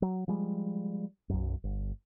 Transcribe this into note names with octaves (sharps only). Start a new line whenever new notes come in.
F#3
F3 G3 G#3
B1 F#2
G1